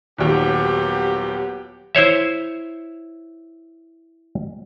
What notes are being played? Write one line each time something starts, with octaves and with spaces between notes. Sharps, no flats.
D#1 D#2 F#3 B3 G4
E4 C5 C#5 E5